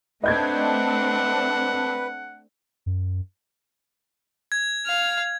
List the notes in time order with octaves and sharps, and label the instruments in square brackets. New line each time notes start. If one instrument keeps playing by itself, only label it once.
[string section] A3 C4 D4 [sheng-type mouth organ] B4 [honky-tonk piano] D#5 G6 G#6 [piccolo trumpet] F#5
[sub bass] F#2
[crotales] G#6
[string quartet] F5 F6